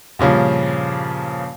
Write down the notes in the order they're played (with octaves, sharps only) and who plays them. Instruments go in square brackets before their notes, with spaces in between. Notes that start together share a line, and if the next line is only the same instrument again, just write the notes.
[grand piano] G2 A#2 C#3 F3